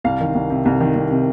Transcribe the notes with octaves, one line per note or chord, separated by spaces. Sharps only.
C2 F5
D#3
C2
C3
C2
D#3
C2
C3